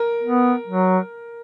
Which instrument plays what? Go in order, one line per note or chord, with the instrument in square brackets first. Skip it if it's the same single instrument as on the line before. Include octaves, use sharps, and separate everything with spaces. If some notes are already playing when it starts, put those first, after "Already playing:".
Already playing: [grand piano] A#4
[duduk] B3
F#3